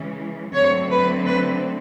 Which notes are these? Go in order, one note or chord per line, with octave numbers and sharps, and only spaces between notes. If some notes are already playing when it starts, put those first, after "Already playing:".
Already playing: C#3 E3 G#3 C#4
D3 F#3 A3 C4 C#5
B4
B4